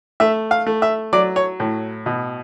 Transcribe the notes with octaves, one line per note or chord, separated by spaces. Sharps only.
A3 E5
F5
A3
E5
F#3 D5
C#5
A2
B2